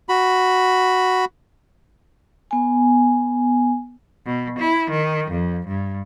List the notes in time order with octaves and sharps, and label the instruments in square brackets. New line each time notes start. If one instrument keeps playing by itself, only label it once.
[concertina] F#4 B5
[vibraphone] B3 G#5
[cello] B2
E4
D#3
F2
G2